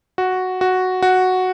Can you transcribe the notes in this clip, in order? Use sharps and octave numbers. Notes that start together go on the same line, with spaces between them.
F#4
F#4
F#4